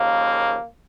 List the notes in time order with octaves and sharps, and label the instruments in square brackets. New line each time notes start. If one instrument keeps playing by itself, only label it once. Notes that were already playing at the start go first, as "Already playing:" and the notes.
Already playing: [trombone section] D#2 C#3 F3 A#3